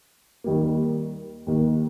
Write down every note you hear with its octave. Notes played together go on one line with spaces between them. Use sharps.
D#2 D#3 G3 A#3
D#2 D#3 A#3